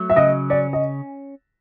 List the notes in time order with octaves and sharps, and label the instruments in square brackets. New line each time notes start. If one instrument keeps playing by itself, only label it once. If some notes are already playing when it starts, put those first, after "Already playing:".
Already playing: [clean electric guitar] F#3 A3
[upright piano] E5
[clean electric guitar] C#3 [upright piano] D#5
[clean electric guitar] C#4 [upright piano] D5
[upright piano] D#5